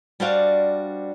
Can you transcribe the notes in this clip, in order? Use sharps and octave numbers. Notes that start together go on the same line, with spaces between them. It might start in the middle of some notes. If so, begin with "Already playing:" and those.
G3 D4 F#4 C5 D5 F5